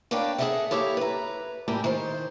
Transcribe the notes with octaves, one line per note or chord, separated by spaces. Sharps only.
A#3 D4 B4 C#5 F5 G5
G#4 A4 B4 D#5 E5 F#5
A#3 E4 G4 A4 C#5
B4 A#5
A2 G3 A#3 G4 G#5
D#3 C5